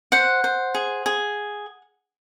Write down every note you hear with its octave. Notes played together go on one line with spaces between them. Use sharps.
C5 F#5
C5
G#4
G#4